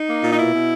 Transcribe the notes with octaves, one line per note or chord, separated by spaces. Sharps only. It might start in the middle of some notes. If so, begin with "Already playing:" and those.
Already playing: D#4
A#3
A#2
D#4
B2 E4
B2